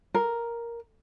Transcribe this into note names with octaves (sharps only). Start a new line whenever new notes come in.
A#4